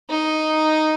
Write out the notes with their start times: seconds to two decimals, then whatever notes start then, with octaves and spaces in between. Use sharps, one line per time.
0.10 D#4